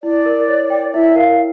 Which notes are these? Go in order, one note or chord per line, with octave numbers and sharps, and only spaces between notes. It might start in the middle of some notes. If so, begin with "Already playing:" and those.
E4 D5
A#4
C#5
G5
E4 E5
A#4 F5